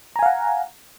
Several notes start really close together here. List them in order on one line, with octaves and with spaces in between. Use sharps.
A#5 G#5 F5 F#5